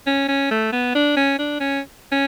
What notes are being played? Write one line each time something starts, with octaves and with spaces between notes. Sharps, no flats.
C#4
C#4
A3
B3
D4
C#4
D4
C#4
C#4